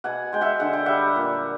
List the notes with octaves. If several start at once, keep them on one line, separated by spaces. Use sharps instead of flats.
B2 F#5 G#5
G#3 G5
E5 F#5
D3 F#5
G5
G3 E5 F#5
A#2